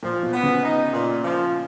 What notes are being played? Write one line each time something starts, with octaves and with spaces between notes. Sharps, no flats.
A#2 F3
B2
B3
C#3
D#4
A#2
F3